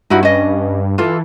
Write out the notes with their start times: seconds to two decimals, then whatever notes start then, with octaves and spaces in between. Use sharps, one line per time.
0.10 G2 D#4 E4 F#4
0.23 C#4 D#5
0.98 E3 F4 A4